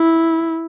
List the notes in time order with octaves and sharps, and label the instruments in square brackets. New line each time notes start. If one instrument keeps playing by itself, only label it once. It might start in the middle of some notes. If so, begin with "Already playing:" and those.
Already playing: [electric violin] E4